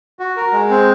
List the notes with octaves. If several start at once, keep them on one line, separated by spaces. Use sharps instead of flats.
F#4
A#4
G#3
C4